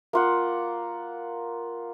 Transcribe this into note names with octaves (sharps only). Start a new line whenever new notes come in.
A#3 F4 F#5